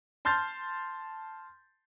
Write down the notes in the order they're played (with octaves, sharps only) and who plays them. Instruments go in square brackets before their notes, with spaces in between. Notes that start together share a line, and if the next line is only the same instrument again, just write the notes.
[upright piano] A5 C6 F6 G6 A6